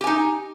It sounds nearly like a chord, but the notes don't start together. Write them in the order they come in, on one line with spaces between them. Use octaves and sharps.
G4 G#5 D#4